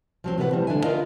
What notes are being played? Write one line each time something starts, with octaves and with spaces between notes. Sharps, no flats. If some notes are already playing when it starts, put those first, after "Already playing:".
F3 F#3 C4
A2 C3 E3 B3 B4 F#5
F3 G3 C4
D3 D4 E4 E5 G#5
F4 A#4 B4 D5 D#5 F5